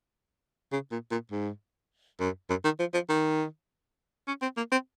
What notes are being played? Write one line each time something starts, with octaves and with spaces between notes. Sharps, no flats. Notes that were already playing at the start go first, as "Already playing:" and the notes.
C#3
A#2
A#2
G#2
F#2
F#2
D#3
F3
F3
D#3
C#4
C4
A#3
C4